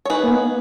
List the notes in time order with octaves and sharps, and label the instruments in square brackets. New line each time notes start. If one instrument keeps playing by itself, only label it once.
[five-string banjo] C#5
[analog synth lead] D#4 [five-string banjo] G#4 B4
[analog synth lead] A#3
B3